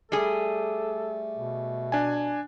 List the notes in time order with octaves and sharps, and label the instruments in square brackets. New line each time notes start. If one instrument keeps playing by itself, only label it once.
[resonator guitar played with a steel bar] G3 G#4 [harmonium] A3 [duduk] A4
[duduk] B2
[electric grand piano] D4 G#5